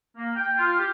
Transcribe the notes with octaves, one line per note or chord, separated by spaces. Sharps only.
A#3
G5
F4
G4